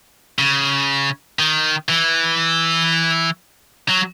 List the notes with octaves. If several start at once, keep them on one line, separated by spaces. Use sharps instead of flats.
C#3
D#3
E3
F#3